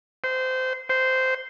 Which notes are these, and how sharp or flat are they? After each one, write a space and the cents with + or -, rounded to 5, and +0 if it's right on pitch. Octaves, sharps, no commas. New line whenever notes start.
C5 -20
C5 -10